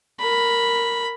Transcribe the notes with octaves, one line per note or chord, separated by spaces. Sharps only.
A#4 B5